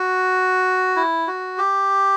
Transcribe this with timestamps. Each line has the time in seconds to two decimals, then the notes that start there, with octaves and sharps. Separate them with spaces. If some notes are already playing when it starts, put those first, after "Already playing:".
Already playing: F#4
0.96 E4
1.28 F#4
1.58 G4